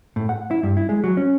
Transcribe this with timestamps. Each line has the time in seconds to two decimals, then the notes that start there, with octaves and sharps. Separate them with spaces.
0.16 A2
0.29 F#5
0.51 E4
0.63 G2
0.77 E4
0.89 G#3
1.04 F#3
1.17 C#4